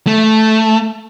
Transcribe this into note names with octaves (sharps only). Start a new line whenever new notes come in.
A3